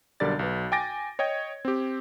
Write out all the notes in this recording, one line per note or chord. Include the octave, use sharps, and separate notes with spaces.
B1 D3 G3 A#4 D5 A6
B1 B4
G5 G#5 D6 A6 A#6 D7
C#5 D#5 G5 G#6
C4 G4